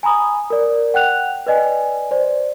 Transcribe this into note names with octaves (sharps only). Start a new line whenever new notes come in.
G#5 A#5 B5 D#6
A#4 D5
F#5 G5 F#6 F7
B4 D5 D#5 G#5
C5 D5